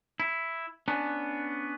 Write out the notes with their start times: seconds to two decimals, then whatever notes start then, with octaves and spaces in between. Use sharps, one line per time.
0.20 E4
0.88 B3 C#4 D4